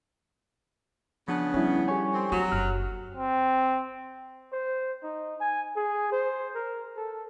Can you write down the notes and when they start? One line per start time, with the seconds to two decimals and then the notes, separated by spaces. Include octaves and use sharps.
1.28 C#3 F3 B3 D4 A5
1.54 G3 C#4 E4
1.88 G4 A4 C#5 G#5 C#6
2.13 C4
2.32 F#3 B3 F#6
2.52 F#1 F6
3.15 C4
4.52 C5
5.03 D#4
5.40 G#5
5.76 G#4
6.12 C5
6.54 A#4
6.96 A4